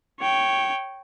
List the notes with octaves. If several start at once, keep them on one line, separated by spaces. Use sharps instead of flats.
C#5 G5